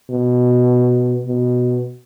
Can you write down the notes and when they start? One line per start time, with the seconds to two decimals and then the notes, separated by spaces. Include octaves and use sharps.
0.10 B2
1.27 B2